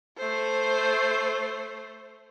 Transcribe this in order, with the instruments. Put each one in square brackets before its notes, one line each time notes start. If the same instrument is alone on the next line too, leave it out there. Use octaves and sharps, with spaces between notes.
[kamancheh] A3 C5